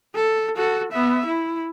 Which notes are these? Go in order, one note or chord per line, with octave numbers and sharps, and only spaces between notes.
A4
F#4 A4
B3 E5
E4